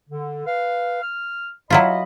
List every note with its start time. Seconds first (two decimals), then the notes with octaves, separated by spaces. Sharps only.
0.10 D3
0.46 B4 F5
1.02 F6
1.70 F#3 E4 F4 D#5 B5